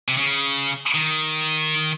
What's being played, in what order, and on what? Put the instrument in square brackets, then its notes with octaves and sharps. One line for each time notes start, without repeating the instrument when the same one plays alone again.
[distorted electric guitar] C3
C#3
D#3